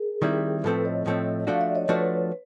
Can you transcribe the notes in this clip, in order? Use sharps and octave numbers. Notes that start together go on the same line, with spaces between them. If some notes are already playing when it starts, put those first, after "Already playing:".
Already playing: G#4 A#4
D#3 G3 C4 E4
A2 F3 A3 C4 A4 B4
C#5 D#5
A2 F3 A3 C4
F3 A3 D4 F#4 F5
D5 E5
C#5 D#5
F3 A3 D4 F#4 B4 C#5